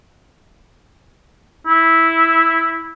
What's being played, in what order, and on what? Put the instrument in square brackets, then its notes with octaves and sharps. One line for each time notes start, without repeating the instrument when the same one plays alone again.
[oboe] E4